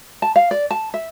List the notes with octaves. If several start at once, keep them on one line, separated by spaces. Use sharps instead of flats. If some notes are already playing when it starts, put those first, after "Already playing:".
A5
F5
D5
A5
E5